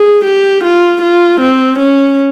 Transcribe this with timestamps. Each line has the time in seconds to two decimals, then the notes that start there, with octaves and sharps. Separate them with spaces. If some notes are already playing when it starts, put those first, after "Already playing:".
Already playing: G#4
0.25 G4
0.64 F4
1.02 F4
1.41 C4
1.79 C#4